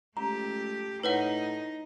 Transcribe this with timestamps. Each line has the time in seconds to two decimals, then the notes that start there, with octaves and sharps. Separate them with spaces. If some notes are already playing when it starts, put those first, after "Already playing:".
0.17 C#2 A3 G4 A#5
1.03 A2 D#4 B4 C#5 F#5